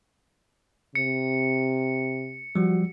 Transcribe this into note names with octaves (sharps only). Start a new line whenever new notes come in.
C3 C#7
F3 G3 F#4